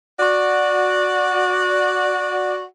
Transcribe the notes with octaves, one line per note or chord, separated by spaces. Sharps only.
F#4 D5